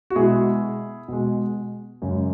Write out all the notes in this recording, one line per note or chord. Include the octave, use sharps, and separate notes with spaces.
F#4
B2 G#3 E4 G#4
B2 G#3
F#2 C#3 G#3